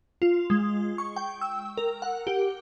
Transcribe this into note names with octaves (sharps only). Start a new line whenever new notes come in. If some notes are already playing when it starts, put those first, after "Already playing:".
F4
G#3
C#6
G5
E6
A#4
F#5
G4